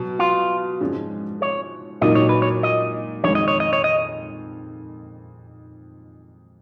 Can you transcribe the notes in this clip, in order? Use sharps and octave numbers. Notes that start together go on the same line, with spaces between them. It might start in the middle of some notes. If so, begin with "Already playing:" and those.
Already playing: B2 F#3
F4
G#2 F3 G#3 C#4
C#5
A#2 F#3 A#3 D#4 D#5
C#5
B4
C#5
D#5
F2 D#3 G#3 C#5
D#5
C#5
D#5
C#5
D#5